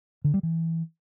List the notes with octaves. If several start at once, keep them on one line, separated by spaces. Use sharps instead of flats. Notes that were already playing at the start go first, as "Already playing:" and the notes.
D3
G3
E3